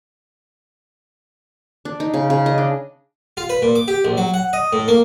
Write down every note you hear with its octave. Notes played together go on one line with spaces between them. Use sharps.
D4
D#4
C#3
C#3
D#5
D4
F4
B4
A#2
D6
G4
A#1
F#3
F#5
D#5
A2
A#3